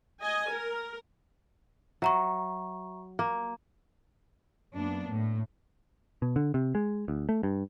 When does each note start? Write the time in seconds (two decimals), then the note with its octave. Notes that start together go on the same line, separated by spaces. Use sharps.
0.20 D#5 G#5
0.50 A#4
2.02 F#3 E5 A#5 C#6
3.19 A#3
4.73 F#2 A#3 B3 D4
5.09 A2
6.22 B2
6.36 D3
6.54 C3
6.75 G#3
7.08 D2
7.29 A3
7.43 G2